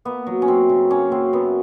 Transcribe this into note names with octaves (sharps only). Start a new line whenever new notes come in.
A#3 B3
F#3
C#4
F#2 C4
C#3
A#3 C#4
F#3 C4
F#2 B3